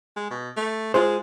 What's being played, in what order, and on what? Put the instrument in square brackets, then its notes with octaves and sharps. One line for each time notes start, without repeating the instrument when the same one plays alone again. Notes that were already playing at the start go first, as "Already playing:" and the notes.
[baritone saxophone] G#3
B2
A3
[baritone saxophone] G#3 [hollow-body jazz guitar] F4 G#4 C5